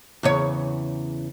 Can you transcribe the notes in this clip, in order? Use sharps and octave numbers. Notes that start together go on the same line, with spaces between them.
E2 C#3 C#5